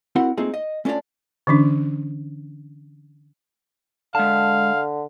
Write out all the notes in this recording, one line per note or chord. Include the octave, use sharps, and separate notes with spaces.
C4 E4 F#4 A#4 F#5
A3 A#3 C4 D#4 F4 G#4
D#5
A3 C#4 D4 F4 C#5 D5
D3 E3 C#4 D4
D3 G#3 F5 A5